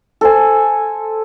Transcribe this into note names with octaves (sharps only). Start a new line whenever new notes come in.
A4 C5 G#5